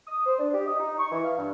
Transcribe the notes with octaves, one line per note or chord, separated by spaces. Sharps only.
D#6
C5
D4
G4
D#5
D#4
C#6
E3
F5
G2